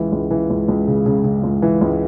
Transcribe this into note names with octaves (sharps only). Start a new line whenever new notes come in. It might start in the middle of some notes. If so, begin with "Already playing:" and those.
Already playing: C#2 E3
C#2
E3
C#2
C#2
C#3
C#3
C#3
C#2
E3
C#2